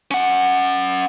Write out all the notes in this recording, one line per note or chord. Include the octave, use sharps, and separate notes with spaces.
C#4 F#5